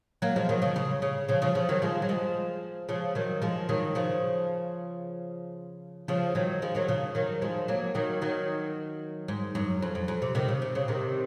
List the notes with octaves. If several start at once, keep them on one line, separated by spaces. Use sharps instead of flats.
F#3 A#3
F3 G#3
D#3 F#3
C#3 F3
C#3
C#3
C#3 F3
C#3 F3
C#3 F3
D#3 F#3
F3 G#3
F#3
F3 G#3
C#3 F3
D#3 F#3
F3 G#3
D#3 F#3
C#3 F3
C#3 F3
D#3 F#3
F3 G#3
D#3 F#3
C#3 F3
D#3 F#3
F3 G#3
F#3 A#3
D#3 F#3
D#3 F#3
G#2
F#2
F2
F2
F2
C3
C3 D#3
C#3
C3
C#3
C3 D#3